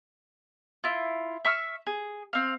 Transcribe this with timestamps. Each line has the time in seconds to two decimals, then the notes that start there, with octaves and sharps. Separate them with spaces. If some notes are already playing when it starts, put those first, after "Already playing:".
0.84 E4 F4
1.45 E5 C#6 E6 F6
1.87 G#4
2.33 C4 F5